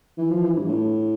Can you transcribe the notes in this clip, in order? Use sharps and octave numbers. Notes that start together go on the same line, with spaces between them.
E3
F3
E3
G2
A2